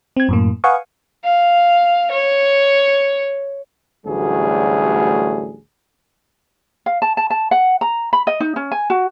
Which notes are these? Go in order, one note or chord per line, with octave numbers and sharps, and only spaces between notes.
C4 G#6
F#2 A2 A#3
B4 F5 F#5 G#5 C#6 D#6
F5
C#5
A1 D2 F#3 G3 G#4
F5
A5
A5
A5
F#5
A#5
B5
D#5
D#4
C#4
G#5
F#4